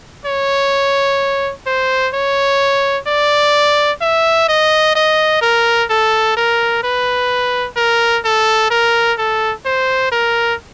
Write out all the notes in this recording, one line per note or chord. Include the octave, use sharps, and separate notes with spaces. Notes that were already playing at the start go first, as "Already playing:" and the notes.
C#5
C5
C#5
D5
E5
D#5
D#5
A#4
A4
A#4
B4
A#4
A4
A#4
A4
C5
A#4